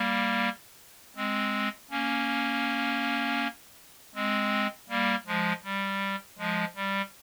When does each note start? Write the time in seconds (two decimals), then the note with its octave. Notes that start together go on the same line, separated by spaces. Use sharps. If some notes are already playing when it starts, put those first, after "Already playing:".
Already playing: G3 A#3
1.16 G#3 C4
1.91 A#3 C#4
4.15 G#3 C4
4.89 G3 A#3
5.27 F3 G#3
5.64 G3
6.38 F3 G#3
6.76 G3